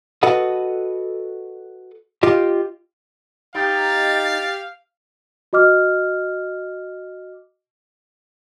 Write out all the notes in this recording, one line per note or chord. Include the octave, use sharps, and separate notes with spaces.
F#4 A4 B4 D#5 F#5
F4 G4 D#5
D#4 G4 F5 A6
F#4 D#5 D6 F6